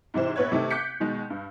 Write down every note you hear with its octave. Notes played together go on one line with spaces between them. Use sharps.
G#2 C3 E3 C5
A#1 B3 B4 C#5 G#6
C3 D#3 A3
D6 F#6 G6 B6 C#7
B2 D#3 G#3
G2